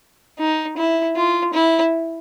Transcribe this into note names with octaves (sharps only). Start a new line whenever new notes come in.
D#4
E4
F4
E4